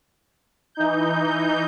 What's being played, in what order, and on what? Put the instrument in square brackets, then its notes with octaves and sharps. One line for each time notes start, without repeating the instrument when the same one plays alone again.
[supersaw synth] E3 D#4 G6